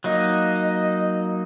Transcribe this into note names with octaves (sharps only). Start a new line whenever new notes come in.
F#3 A#3 D#4 D#5